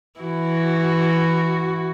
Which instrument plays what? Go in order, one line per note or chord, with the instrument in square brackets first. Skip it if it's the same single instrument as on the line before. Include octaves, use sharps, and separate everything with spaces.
[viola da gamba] E3 E4 [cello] F#4